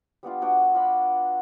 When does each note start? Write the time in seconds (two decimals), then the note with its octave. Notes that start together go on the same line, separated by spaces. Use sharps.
0.23 G3 B3 D4 F4
0.41 B3 D4 F#4 G5
0.74 F4 F#4 D5 B5